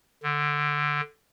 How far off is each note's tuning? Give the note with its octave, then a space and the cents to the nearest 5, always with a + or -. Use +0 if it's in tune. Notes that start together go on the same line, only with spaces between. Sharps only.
D3 +5